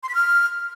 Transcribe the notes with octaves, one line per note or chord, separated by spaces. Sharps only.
C6
B6
F6